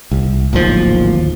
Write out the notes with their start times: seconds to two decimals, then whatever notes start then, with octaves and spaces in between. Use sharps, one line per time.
0.11 C2
0.53 D1 G#1 D#2 F3